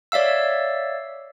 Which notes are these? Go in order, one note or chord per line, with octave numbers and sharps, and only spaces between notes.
C#5 D5 E5 F5 E6